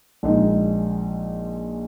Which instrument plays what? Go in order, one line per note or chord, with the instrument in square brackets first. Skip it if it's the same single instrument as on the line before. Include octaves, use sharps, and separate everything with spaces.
[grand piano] A#1 A#2 G#3 D#4